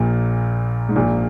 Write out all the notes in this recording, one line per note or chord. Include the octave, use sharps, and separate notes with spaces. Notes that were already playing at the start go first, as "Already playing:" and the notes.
Already playing: A#1 A#2
G#2
A#1 A#2